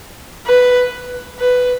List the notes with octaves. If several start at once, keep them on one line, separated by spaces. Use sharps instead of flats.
B4
B4